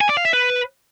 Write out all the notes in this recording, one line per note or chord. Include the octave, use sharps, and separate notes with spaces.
G#5
D5
F5
E5
B4